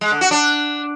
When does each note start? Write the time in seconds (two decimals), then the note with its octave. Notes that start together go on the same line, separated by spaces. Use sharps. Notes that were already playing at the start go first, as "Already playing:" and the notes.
0.01 G#3
0.11 D3
0.21 F#4
0.31 D4